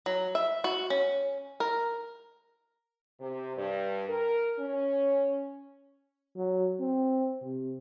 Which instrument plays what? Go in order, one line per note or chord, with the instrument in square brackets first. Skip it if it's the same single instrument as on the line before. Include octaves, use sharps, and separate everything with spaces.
[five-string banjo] F#3
E5
F#4
C#4
A#4
[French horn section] C3
G2
A#4
C#4
[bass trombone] F#3
C4
C3